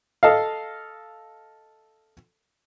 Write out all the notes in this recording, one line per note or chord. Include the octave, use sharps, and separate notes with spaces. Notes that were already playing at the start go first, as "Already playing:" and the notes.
A4 D#5 F5